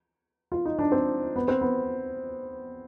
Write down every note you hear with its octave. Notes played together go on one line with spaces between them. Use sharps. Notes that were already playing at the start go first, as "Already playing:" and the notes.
F4
D#4
D4
C4
B3
C4
B3